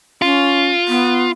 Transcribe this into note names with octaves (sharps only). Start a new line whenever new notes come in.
C#4 F4
B3